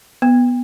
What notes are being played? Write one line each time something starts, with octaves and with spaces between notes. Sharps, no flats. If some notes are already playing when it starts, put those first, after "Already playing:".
B3